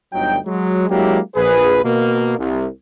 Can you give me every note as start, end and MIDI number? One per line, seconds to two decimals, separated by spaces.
0.13 0.37 31
0.13 0.37 38
0.13 0.37 54
0.13 0.37 63
0.13 0.37 79
0.46 0.88 54
0.46 0.88 56
0.90 1.18 54
0.90 1.18 56
0.90 1.18 58
0.90 1.18 62
0.90 1.18 64
0.90 1.18 67
1.36 1.81 34
1.36 1.81 68
1.36 1.81 71
1.84 2.37 47
1.84 2.37 58
2.38 2.67 36